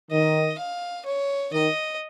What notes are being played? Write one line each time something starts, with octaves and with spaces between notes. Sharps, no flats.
D#3 D#5
F5
C#5
D#3 D#5